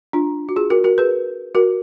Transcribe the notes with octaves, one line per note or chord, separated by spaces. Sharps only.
D4 F4
F#4
F4 G#4
F#4 A#4
F#4 A#4
G#4 B4
F#4 A#4